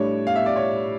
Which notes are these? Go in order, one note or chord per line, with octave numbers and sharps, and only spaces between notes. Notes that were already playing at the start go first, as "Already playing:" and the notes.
Already playing: A2 G3 D4 C#5
F5
E5
D5
C#5